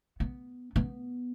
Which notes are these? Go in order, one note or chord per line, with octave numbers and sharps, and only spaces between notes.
B3
B3